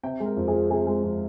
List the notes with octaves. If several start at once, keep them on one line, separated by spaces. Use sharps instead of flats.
C3 G5
G#3 A#4
F2
G#4
F3
C3 G#4
G#3
F2